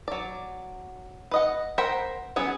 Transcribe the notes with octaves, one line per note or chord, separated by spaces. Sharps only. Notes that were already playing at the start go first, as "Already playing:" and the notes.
F#3 D5
B4 D#5 F#5
A#4 C5 F#5 G5 B5
F#3 B3 C#4 G#4 F#5